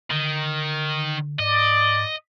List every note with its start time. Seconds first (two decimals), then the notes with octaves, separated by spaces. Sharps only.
0.11 D3 D#3
1.39 G#2 D5 D#5